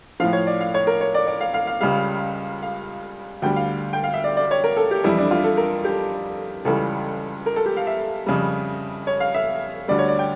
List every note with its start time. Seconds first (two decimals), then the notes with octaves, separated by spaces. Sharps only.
0.20 A2 F3 F5
0.33 C#5
0.47 D5
0.60 F5
0.74 C#5
0.87 A#4
1.01 C#5
1.14 D5
1.27 D5
1.41 F5
1.54 F5
1.67 F5
1.81 C#2 C#3 G3 F5
2.62 F5
3.42 D2 D3 G3 G5
3.56 F5
3.93 G5
4.04 F5
4.14 E5
4.24 D5
4.37 D5
4.51 C#5
4.64 A#4
4.77 A4
4.91 G4
5.04 F2 E3 G3 E4
5.18 D4
5.31 F4
5.44 A4
5.57 A#4
5.85 G4
6.65 C#2 C#3 E3 G3 A4
7.46 A#4
7.56 A4
7.66 G4
7.77 F5
7.87 E5
8.26 F2 C#3 G3
9.07 C#5
9.20 F5
9.34 E5
9.88 D2 D3 G3 D5
9.99 C#5
10.08 D5
10.19 G5